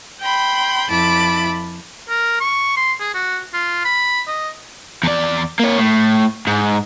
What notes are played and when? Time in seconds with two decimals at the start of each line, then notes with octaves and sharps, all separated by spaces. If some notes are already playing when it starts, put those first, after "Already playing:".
0.21 G5 B5 C6
0.89 F2 E4 A5 B5 D6
2.09 A#4
2.41 C#6
2.77 C6
3.00 G#4
3.14 F#4
3.54 F4
3.85 B5
4.28 D#5
5.03 E2 D5
5.59 A#3 C#5
5.78 A2
6.47 G#2